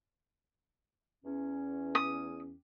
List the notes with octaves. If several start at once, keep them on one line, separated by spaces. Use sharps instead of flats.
E2 C#4
D#6